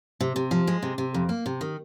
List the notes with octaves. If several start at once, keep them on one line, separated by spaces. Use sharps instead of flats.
C3
C3
F3
G#3
C3
C3
F2
A#3
C3
D#3